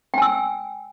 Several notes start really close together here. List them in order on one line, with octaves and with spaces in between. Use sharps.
G5 G#5 E6